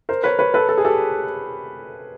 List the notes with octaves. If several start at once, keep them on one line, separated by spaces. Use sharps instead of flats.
A#4 C5
B4 C#5
B4 C#5
A4 B4
A4
G#4
G4 A4